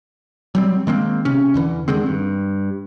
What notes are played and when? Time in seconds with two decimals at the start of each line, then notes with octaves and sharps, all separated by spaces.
0.55 F#3 G3 C4
0.87 D#3 G#3 A#3 C4
1.25 C3 C#4
1.54 E2 D3 E3
1.88 D3 D#3 G#3 C4
2.06 G2